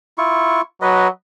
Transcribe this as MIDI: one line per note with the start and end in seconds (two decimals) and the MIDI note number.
0.18 0.61 64
0.18 0.61 65
0.18 0.61 85
0.82 1.08 54
0.82 1.08 71
0.82 1.08 75